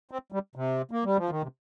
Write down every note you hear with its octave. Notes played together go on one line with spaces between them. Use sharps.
C4
G3
C3
A#3
G3
F3
D#3
C3